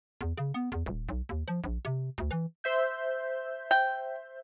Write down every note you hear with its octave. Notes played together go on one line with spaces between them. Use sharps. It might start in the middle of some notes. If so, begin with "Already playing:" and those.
E2
C#3
B3
E2
D#1
B1
D#2
F3
A#1
C3
D2
E3
C5 E5 G6
G5